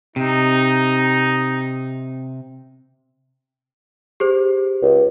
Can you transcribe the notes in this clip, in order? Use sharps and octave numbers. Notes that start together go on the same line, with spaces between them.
C3 D#4
G4 G#4 C5
C#2